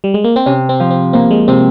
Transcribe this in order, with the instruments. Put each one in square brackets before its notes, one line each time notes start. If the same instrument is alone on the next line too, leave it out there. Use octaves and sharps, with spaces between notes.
[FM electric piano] G3
G#3
A#3
C4
[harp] C3 [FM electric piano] C#4
[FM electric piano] C4
[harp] F3
[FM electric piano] C4
[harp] A#3 [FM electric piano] C4
[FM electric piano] G#3
[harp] C3 [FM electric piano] C4